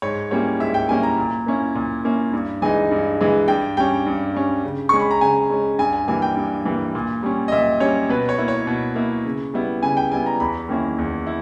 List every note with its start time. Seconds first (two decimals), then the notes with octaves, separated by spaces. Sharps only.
0.02 G#2 C#5
0.31 G3 A#3 C#4 E4 C#5
0.60 G#2 E5
0.74 G5
0.89 G3 A#3 C#4 E4 G#5
1.03 A#5
1.18 A#2
1.46 A#3 C#4 E4
1.75 A#2
2.05 A#3 C#4 E4
2.33 G2
2.62 E3 G#3 D#4 G#5
2.91 G2
3.20 E3 G#3 D#4
3.48 G2 G5
3.77 G3 C#4 G5
4.06 G2
4.35 G3 C#4
4.64 C#3
4.89 G#3 C#4 C#6
5.00 B5
5.11 A#5
5.21 C#3 G#5
5.50 G#3 C#4
5.79 G2 G#5
5.93 G#5
6.08 E3 G3 A#3 G#5
6.22 G5
6.37 G2
6.65 E3 G3 A#3
6.95 A#2
7.23 G3 C#4
7.48 D#5
7.52 A#2 E5
7.80 G3 C#4 C#5
8.09 B2 B4
8.29 C#5
8.38 A#3 E4
8.48 C#5
8.67 B2
8.95 A#3 E4
9.25 C#3
9.54 G3 B3 E4
9.83 C#3 G#5
9.97 G5
10.11 G3 B3 E4 G#5
10.26 A#5
10.40 E2 B5
10.69 D#3 A#3 C#4 E4
10.98 E2
11.27 E4